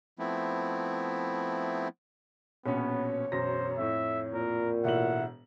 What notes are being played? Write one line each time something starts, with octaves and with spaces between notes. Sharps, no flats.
F3 A3 B3 C4 E4
A#1 B2 B3 C#4 C#5
E1 F#2 C5 A#6
F2 A2 E5
A#2 A#4
E1 A2 E5 F#5 F#7